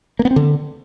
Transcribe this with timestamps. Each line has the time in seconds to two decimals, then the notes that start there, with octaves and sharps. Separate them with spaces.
0.19 A#3
0.25 B3
0.31 C4
0.36 D3